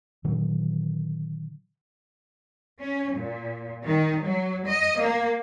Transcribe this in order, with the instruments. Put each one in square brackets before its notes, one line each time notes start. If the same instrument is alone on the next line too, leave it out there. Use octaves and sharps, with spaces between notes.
[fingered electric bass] A#2 D3 D#3 F#3
[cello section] C#4
A#2
D#3
F#3
D#5
A#3